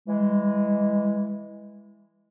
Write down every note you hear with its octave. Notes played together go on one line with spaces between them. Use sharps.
E3 G3 G#3